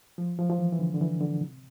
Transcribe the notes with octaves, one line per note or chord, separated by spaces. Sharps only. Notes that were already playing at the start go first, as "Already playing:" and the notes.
F3
F3
F3
E3
E3
D3
D3
E3
D3
C3